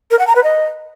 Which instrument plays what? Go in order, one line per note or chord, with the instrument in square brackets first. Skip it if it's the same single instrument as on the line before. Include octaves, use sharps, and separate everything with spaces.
[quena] A#4
F#5
A#5
B4
D#5